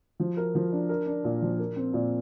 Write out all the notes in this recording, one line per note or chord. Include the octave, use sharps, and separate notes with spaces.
F3
A#4
F3
D4
A#4
D4
A#2
F3
A#4
C4
A#2